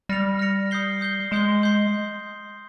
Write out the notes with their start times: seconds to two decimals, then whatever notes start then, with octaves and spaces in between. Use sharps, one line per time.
0.09 G3 F6 A#6 C#7 F7
0.39 F6 A#6 C#7 F7
0.71 D#6 G6 C7 G7
1.01 D#6 G6 C7 G7
1.31 G#3 C6 D#6 G6 C7 G7
1.62 C6 D#6 G6 C7 G7